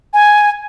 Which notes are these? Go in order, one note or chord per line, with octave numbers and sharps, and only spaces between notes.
G#5